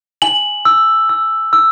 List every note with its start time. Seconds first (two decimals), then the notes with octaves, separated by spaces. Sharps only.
0.22 G#5 F#7
0.65 E6
1.09 E6
1.53 E6